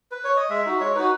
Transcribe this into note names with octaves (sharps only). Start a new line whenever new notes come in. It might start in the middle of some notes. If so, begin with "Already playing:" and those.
B4
C#5
D#5
G#3 E5
D#4 F#4
G#3 C#5
D#4 F#4 B4